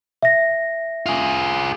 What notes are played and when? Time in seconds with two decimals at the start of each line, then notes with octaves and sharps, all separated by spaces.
0.22 E5 A#6
1.06 F4 G#4